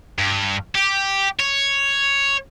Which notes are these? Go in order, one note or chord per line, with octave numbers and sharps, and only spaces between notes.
G2
G4
C#5